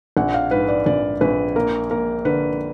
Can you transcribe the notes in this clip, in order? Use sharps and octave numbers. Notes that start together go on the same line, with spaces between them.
A#1 F#5
F5
G#2 B4
D5
A#1 D5
A#1 B4
A#3 A#4
A#3 A#4
D3 B4